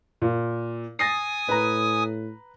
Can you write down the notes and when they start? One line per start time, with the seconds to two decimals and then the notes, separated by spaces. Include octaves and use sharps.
0.22 A#2
0.99 G#5 D#6 A6 A#6 C7
1.49 A2 B4 A#5